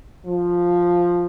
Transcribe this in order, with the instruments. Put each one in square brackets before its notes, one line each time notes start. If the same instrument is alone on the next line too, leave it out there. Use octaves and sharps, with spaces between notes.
[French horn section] F3